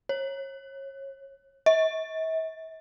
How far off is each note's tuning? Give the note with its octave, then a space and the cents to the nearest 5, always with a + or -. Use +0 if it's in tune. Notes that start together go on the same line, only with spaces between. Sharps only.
C#5 -30
E5 -45